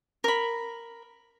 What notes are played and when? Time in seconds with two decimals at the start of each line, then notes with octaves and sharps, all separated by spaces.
0.24 A#4 B5